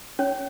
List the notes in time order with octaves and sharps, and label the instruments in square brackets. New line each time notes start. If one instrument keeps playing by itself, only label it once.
[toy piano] C#4 C#5